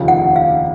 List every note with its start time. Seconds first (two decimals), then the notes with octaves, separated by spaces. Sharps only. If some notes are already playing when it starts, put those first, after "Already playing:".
Already playing: F1 D#2 C#3 F3
0.08 F#5
0.36 F5